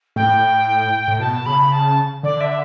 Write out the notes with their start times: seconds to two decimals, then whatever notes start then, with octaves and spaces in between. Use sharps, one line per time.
0.16 A2 G5
1.08 A2
1.19 B2 A5
1.45 C#3 B5
1.72 A5
2.23 D3 D5
2.40 E5